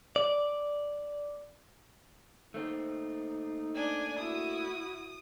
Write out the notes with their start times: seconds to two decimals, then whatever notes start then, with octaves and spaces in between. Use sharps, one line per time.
0.16 D5
2.54 A3 A#3 D#4 C5
3.75 D4 G#5
4.19 E4 F#4 D#6